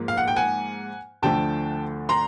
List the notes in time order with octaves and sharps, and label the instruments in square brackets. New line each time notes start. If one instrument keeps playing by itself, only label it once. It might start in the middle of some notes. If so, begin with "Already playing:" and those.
Already playing: [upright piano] G#2 F3 A#3
F5
F#5
G5
F#5 G#5
D2 D3 F3 A3 G5 A5
A#5 C6